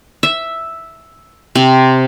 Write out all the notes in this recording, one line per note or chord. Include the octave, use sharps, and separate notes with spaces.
E5
C3